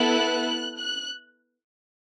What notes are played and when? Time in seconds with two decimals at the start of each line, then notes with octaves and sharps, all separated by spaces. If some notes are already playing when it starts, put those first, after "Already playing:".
Already playing: B3 E4 A4 F#6
0.79 F#6